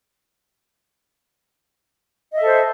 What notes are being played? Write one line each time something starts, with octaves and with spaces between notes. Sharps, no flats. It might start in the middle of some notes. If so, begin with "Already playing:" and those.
A4 C5 D#5 E5